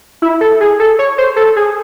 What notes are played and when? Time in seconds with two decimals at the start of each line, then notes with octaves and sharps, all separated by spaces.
0.22 E4
0.41 A4
0.60 G#4
0.80 A4
0.99 C#5
1.18 C5
1.36 A4
1.56 G#4